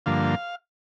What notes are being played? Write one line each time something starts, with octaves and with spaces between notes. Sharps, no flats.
G2 D3 F3 A#3 F5